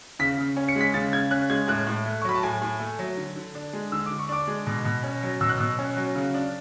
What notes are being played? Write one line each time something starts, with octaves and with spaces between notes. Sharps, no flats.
C#3 B6
C#3
C#4
C#7
G#3
B6
C#3 A6
C#3 G#6
C#4 F#6
G#3 G#6
A2 F#6
A2
A3
C#6
F#3 B5
A5
A2 G#5
A2
A3
F#3
D3
D3
D4
G#3
D3 E6
D3 D6
C#6
D4 D6
G#3
B2
B2
C#4
F#3
B2 E6
F#6
B2 E6
C#4
F#3
C#3
D4